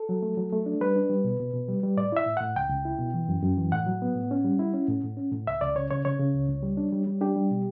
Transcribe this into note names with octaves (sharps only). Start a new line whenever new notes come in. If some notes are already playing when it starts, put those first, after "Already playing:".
Already playing: A4
F#3
A3
F#3
A3
D4
G3 B4
D4
G3
B2
B2
B2
G3
G3
A2 D5
E4 E5
A2
A2 F#5
C#2 G5
C#2
E4
B2
E3
F#2
F#2
E3
A2 F#5
F#3
B3
A2
C#4
G3
E4
C#4
A2
A2
C#4
A2
C#2 E5
C#2 D5
C#3 C#5
C#3 C#5
C#3 C#5
C#3
C#2
C#2
G3
D4
G3
G3
D4 G4
G3
B2